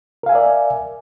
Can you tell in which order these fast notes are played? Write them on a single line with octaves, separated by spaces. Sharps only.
A#4 F5 G#5 E5 D5